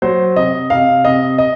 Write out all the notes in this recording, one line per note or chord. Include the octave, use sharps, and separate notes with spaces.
F#3 C5
C3 D#5
C3 F5
C3 D#5
D#5